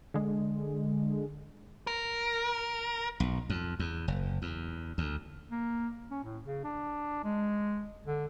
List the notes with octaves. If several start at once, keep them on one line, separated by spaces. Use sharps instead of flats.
D3 G#3
A#4
B1
F2
E2
F#1
E2
D2
A#3
C#4
A2
C#3
D4
G#3
D3